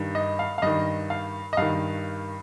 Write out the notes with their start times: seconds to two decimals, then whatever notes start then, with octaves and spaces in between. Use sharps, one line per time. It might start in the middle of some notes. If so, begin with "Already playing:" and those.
Already playing: G2 D#3
0.15 D#5
0.39 F5
0.58 F5
0.62 G2 D#3 D#5
1.10 F5
1.53 D#5
1.57 G2 D#3 F5